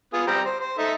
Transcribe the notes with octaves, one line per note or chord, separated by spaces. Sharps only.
B3 F4 G#4
G3 C4 A#5
C5
C5
D#4 A4 E5